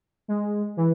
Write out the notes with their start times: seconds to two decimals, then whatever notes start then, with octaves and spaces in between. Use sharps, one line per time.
0.28 G#3
0.77 E3